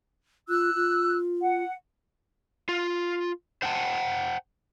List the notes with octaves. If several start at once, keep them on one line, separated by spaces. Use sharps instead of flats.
F4 E6 F#6
F4
F#5
F4
C5 F#5 G5 A5